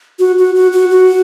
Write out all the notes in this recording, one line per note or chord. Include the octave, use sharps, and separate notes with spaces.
F#4
F#4
F#4
F#4
F#4